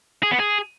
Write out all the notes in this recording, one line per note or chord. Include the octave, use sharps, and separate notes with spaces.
G#4
B3
G#4